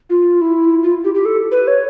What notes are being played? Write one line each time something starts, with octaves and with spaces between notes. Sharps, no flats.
F4
E4
F4
G4
G4
A4
B4
C#5